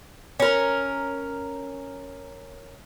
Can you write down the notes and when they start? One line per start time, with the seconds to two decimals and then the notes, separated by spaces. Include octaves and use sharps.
0.40 C#4 A#4